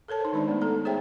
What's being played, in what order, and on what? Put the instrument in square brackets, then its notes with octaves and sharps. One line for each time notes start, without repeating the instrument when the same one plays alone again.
[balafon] A4 A#4 C#5 A5
D#4 C5
D#3 G#3 D4 D5
A3 B3
D#4 A4 A#5
G#4 C5 C#5 E5 G5